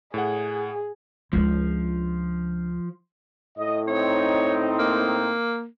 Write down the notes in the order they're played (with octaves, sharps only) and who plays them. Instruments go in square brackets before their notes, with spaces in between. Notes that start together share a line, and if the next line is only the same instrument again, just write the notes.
[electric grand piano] A2 F#5 [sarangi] G#4
[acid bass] C#2 [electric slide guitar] F3 [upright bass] G#3 D4
[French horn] A2 [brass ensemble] D#5
[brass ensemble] C4 D#4 [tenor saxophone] C#5
[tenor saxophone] A#3